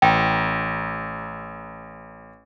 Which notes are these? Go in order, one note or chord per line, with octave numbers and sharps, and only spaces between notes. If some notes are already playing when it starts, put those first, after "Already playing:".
A1 G5